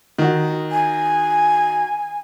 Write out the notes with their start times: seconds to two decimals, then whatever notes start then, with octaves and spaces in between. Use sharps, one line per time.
0.18 D#3 F#4
0.72 G#5